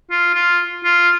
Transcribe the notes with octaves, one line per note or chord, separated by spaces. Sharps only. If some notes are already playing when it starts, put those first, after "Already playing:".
F4
F4
F4